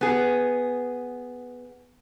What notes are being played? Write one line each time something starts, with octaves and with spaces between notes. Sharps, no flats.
B3 G#4